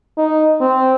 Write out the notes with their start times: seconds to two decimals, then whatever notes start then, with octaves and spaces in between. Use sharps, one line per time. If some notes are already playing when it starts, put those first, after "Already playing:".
0.18 D#4
0.61 C4